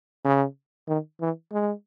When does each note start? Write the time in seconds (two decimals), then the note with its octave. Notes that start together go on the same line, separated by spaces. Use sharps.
0.24 C#3
0.88 D#3
1.21 E3
1.52 G#3